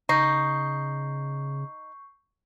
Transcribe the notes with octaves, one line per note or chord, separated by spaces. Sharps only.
C#3 D#4 C#6 G6 C7